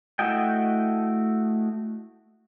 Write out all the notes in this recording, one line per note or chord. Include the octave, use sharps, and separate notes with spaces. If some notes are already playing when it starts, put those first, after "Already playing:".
A3 E4 F#4 D#5 G5